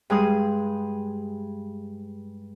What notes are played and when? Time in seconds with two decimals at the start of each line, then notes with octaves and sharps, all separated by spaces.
0.10 G2 G#3 G#4 D#6